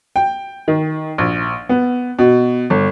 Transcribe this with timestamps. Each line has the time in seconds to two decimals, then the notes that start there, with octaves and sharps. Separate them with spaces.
0.16 G5
0.68 D#3
1.18 A#1
1.69 B3
2.19 B2
2.70 G1